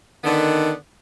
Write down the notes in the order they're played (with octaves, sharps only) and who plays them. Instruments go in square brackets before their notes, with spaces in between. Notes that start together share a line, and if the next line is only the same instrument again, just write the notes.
[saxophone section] D3 B3 [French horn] D#3